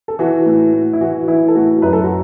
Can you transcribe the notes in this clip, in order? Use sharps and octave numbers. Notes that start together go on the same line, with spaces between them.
A4
E3 F#4
A2
A2
E4
E3 F#4
E3 E4
A4
A2 F#4
F#2 B4
A4
F#4